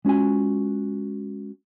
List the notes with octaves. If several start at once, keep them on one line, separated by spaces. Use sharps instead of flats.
G#3 C#4 F4 F#4 G#5